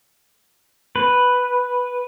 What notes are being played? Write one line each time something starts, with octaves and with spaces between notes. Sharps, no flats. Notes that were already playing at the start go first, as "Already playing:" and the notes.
B4